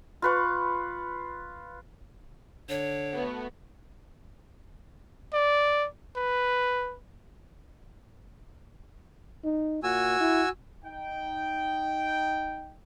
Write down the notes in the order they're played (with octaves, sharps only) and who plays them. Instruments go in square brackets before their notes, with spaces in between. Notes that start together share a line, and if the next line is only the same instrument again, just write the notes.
[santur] F4 B4 C#6
[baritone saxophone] D3 [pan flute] C#5
[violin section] A3 B3 F#4
[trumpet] D5
B4
[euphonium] D#4
[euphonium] A#2 [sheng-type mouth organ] F#4 G#5 E6
[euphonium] E4
[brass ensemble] D#4 G5